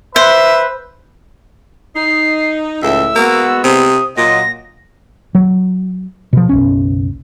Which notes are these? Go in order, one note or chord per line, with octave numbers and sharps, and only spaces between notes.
B4 C5 E5
D#4 C7
C#2 A2 E5 E6
G#3 A#3 B3 F#4
C3 D#6
A#2 F#3 F4 D#5 A#6
F#3
B2 F3
F#1 B1 C#4